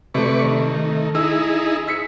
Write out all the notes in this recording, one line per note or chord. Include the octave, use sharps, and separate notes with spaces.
C3 A3 B4 D5 C#6
D#3
A3
D#4 E4 G#4 E6
E6 B6 C#7